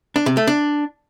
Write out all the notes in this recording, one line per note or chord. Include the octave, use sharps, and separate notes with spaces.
D4
C3
A3
D4